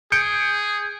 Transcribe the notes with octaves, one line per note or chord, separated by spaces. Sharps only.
G#4 G6 C#7 D7